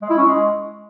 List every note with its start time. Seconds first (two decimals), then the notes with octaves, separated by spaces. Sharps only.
0.02 G#3
0.10 E4
0.18 C#4
0.25 G#3